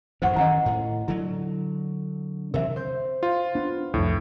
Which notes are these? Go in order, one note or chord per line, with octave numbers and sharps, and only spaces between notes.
A1 F#2 A2 C5 F#5 C#6
D#3 E3 C#4 D#5 F#5 A#5
A2
D3 F#3 E4
C3 E3 A#4 E5
C5 G6
F4
B3 D4
C2 F2 A2